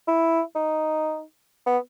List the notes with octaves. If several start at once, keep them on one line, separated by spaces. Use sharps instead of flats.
E4
D#4
B3